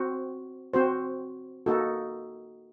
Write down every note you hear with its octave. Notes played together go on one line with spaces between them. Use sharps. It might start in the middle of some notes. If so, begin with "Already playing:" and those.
Already playing: C4 F#4 C5
C4 F#4 C5
A#3 D#4 F#4 A4